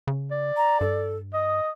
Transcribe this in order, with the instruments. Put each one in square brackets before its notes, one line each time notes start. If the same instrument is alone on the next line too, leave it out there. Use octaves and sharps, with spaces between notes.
[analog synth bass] C#3
[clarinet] D5
[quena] A#5
[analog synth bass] G2 [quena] A4
[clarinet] D#5 [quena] D#6